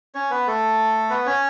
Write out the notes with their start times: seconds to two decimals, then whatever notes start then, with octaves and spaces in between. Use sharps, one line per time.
0.15 C#4 C#5
0.31 B3 B4
0.47 A3 A4
1.10 B3 B4
1.26 C#4 C#5